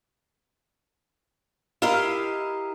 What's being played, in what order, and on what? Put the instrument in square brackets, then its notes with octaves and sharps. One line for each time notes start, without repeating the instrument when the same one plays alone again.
[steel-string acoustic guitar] E4 G4 A#4 D#5 F5